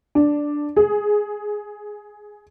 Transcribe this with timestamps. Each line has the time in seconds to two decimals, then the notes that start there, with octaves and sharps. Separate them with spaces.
0.15 D4
0.76 G#4